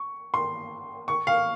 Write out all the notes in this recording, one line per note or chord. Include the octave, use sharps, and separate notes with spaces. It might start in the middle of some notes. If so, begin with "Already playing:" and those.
Already playing: C#6
C6
C#6
F5